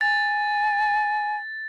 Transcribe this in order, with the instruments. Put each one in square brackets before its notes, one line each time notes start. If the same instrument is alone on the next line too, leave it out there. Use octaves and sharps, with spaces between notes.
[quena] G#5 [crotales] A6